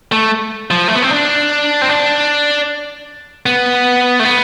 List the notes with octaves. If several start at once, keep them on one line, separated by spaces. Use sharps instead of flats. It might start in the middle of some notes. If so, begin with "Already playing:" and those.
A3
F3
A3
B3
C4
D4
C4
D4
B3
A3
B3